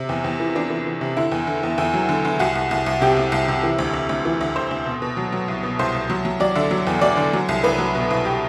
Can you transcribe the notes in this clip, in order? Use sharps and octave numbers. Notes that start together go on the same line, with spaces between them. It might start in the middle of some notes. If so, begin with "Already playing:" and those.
Already playing: C3
E2
E2
E3
E3 D4
E3
E3
C3
D3 E4
E2
D3
E2
E2 E4
F#3
D3
D3
C2 F#4
C2
C2
C2
C3 G4
C2
C2
C3
E3
D2
D2
D2
E3
D2
D2 C5
D2
B2
B2
F#3
F#3
C2
B2
C2 C5
C2
F#3
F#3
F#3 D5
D3 E5
F#3
E2
F#3 D5
D3
F#3
C2
C2 B4
F#3
B2
C2
G4